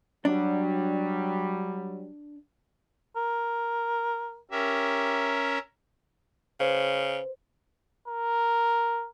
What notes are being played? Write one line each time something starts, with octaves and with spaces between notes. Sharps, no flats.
F#3 G3 D4
A#4
C#4 G4 A#4 E5
C#3 B4 C5
A#4